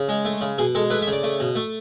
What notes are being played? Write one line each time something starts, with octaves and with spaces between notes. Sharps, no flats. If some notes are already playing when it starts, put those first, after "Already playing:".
Already playing: C#3
G#3
A3
C#3
B2 G#4
G#3 A4
A3 B4
E5
C#3
D5
A3
B2
A3